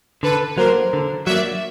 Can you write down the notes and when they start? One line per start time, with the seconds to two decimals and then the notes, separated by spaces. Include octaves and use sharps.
0.23 D3 A4 B4
0.57 F#3 A#3 A#4 C5
0.93 D3
1.27 F#3 A#3 D5 E5